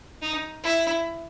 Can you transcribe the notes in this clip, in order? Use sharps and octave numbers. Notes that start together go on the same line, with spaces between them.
D#4
E4